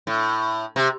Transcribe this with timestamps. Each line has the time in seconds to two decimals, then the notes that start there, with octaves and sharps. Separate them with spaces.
0.07 A2
0.76 C3